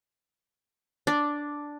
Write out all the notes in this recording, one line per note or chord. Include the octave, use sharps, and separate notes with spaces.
D4